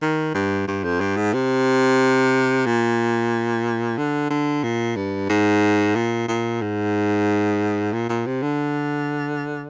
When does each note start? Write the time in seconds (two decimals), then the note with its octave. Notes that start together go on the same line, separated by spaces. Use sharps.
0.02 D#3
0.35 G2
0.68 G2
0.84 F2
1.01 G2
1.17 G#2
1.34 C3
2.66 A#2
3.98 D3
4.30 D3
4.64 A#2
4.96 G2
5.29 G#2
5.95 A#2
6.28 A#2
6.61 G#2
7.93 A#2
8.09 A#2
8.26 C3
8.43 D3